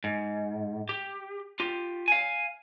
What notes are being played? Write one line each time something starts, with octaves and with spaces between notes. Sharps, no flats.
G#2
G4
F4 G4
F5 G#5